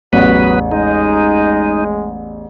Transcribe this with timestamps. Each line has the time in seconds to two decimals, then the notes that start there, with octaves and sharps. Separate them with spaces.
0.13 A1 E2 F#3 B3 F#4 B4
0.71 G#3 D#4